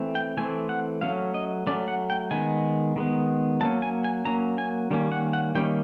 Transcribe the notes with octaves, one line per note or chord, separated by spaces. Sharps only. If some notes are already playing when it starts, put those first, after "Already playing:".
Already playing: E3 A3 C4
G5
E3 A3 C4 G#5
F#5
F#3 A3 C#4 F5
D#5
F#3 A3 C#4 D5
F#5
G5
D#3 G#3 B3 G#5
D#3 G#3 B3
F#3 A#3 C#4 A5
G#5
G#5
F#3 A#3 C#4 A#5
G#5
D#3 G3 A#3 C#4
F#5
F#5
D#3 G3 A#3 C#4 G5